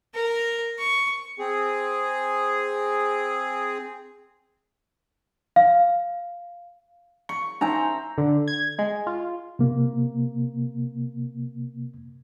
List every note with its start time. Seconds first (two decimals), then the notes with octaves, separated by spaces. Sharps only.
0.14 A#4
0.78 C#6
1.39 C4 G#4
5.56 F5
7.29 C#6
7.61 C#4 D#4 C5 E5 G#5 A#5
8.18 D3
8.48 G#6
8.79 G#3
9.07 F4
9.59 C3 A#3